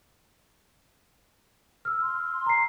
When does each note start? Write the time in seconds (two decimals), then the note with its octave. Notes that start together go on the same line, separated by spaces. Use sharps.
1.85 E6 F6
2.02 C6
2.46 A#5 C7